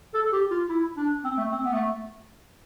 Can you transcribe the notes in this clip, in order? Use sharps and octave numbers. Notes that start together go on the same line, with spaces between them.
A4
G4
F4
E4
D4
C4
A3
C4
B3
A3